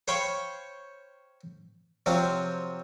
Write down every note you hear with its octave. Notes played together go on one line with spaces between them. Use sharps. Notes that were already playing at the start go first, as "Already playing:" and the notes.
C5 C#5 F5 G5 B5 C#6
C3 F3 F#3 C4